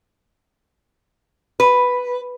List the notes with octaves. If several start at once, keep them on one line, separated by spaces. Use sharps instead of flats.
B4